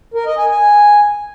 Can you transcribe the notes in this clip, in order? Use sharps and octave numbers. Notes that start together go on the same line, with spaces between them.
A#4
D#5
G#5
G#5